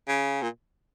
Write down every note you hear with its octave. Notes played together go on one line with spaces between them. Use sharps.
C#3
A#2